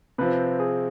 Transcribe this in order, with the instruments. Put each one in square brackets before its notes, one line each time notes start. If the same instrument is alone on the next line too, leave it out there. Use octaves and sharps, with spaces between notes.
[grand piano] C3 F3 C4 [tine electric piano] B4
[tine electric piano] G#4